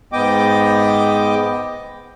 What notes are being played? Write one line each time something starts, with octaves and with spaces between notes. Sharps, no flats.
G#2 B3 D#5 G5 D6